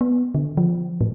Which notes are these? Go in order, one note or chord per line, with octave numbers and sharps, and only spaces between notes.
B3
D3
F3
A2